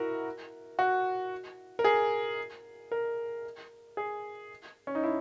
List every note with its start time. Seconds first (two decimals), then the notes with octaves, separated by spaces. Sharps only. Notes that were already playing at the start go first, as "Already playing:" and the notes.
Already playing: E4 F#4 A#4
0.79 F#4
1.79 A#4
1.84 G#4
2.92 A#4
3.97 G#4
4.87 C#4
4.95 D#4
5.04 E4